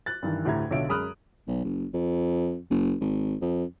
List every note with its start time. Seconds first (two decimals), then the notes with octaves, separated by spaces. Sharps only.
0.06 F#6 A6
0.22 G2 D#3 E3
0.45 D2 A2 G4 E5 A#5 G#6
0.71 B1 D3 F4 C#5 E5 D7
0.89 F#2 G#3 B5 D#6 F6 F#6
1.47 B1
1.64 F#1
1.94 F2
2.70 F#1
3.01 G#1
3.41 F2